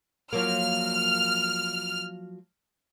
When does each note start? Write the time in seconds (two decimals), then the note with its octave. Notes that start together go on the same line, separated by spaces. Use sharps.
0.33 F3 F#3 A#3 F6